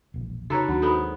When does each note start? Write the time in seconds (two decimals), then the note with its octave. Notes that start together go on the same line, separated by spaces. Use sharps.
0.14 E1 A#1
0.50 C#3 D#4 F#4 A4 B4 C#5 A#5
0.68 D#2 F#3 D4
0.82 G#2 B3 D#4 A4 B5